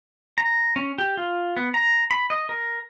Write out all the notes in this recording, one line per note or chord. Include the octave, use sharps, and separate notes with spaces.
A#5
C#4
G4
F4
B3
A#5
B5
D#5
A#4